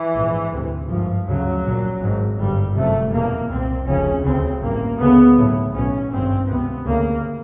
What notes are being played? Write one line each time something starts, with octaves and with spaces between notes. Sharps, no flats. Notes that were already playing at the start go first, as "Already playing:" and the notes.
Already playing: E3
A#1 G#2
D2 C3
G#1 G2 F3
D2 C#3 F#3
A#1 A#2
G#1 G#2
G1 G2 G3
F#1 F2 C3 A3
F1 E2 B2 A#3
C2 A#2 C4
F1 D#2 C#3 C#4
D2 C#3 C4
A1 G2 A#3
D2 C#3 B3
B1 A2
B1 B2 C#4
G#1 G2 C4
C#2 C3 B3
D2 C#3 A#3